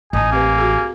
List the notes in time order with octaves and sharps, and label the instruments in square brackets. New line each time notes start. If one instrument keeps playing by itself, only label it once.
[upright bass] A1 [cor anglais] D#4 [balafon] D#5 A5 [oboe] G#5
[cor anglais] A#3 [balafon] C4 G4 B4
[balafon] F#4 G#4